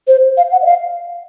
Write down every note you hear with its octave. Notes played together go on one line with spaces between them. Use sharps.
C5
F5
F#5
D#5
F5